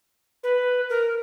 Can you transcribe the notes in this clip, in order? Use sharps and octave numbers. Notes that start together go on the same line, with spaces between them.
B4
A#4